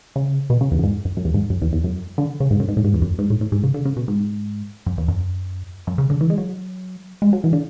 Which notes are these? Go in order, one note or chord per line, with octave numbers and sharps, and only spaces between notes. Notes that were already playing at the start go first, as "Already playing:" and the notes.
C#3
B2
C#3
E2
F#2
G#2
F#2
F#2
E2
G#2
F#2
E2
E2
F#2
D3
C#3
G#2
F#2
G#2
A2
G#2
E2
F#2
G#2
A2
A2
G#2
C#3
D3
C#3
B2
G#2
F#2
E2
F#2
F#2
C#3
D3
E3
G#3
F#3
G#3
F#3
E3
D3